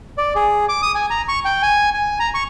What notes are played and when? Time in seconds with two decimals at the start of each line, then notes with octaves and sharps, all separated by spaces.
0.18 D5
0.36 G#4
0.69 D6
0.82 D#6
0.95 G#5
1.10 A#5
1.28 C#6
1.45 G5
1.62 G#5
1.94 G#5
2.20 A#5
2.34 C#6